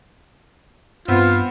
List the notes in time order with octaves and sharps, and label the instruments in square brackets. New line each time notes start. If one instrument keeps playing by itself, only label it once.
[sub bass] G2 [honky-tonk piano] B3 C4 [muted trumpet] F4